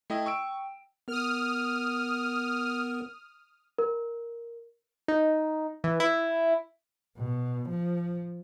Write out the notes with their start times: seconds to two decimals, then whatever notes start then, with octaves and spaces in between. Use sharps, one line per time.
0.10 A3 E4 D#5 G5
0.26 C#6 E6 D7
1.08 B3 A#4 D#6 F6
3.79 A#4
5.08 D#4
5.84 E3
6.00 E4
7.17 B2
7.70 F3